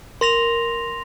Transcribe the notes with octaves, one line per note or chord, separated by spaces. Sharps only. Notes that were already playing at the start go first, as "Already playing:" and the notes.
A#4 C6 A#6 F7